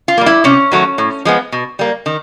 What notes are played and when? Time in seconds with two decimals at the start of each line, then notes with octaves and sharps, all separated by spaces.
0.08 F4
0.17 G3 A#3
0.26 E4
0.44 C3 C#4
0.72 D#3 F#3 A3
0.98 A2
1.25 F3 G#3 B3
1.52 B2
1.79 G3 A#3
2.06 D#3